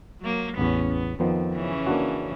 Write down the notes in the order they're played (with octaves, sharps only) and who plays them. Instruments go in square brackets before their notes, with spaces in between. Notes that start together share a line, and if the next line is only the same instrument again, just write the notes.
[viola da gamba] F#3 A#3
[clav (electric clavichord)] A1 E2 [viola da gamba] B3 C#4
[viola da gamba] B3
[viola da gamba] F2 [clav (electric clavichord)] D#3 F3 B3
[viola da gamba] C#3 E3 C#4
[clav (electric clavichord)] A#3 D4 F#4